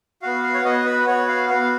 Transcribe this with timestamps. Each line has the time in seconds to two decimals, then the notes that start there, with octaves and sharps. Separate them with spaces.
0.22 B3 F#4 F5
0.43 F5
0.54 C#5
0.65 B3 F#4 D#5
0.86 B4
1.07 B3 F#4 C#5
1.28 F5
1.49 B3 F#4 F5